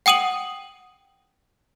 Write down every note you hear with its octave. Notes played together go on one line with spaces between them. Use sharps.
F#5 G5 D#6 D#7 F#7